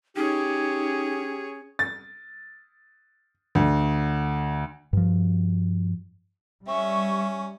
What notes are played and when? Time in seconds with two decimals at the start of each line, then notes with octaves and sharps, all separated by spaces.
0.16 C#4 D#4 G4 G#4 C#5
1.79 A6
3.55 D2
4.93 G2 F3
6.67 G3 C#4 E5 C#6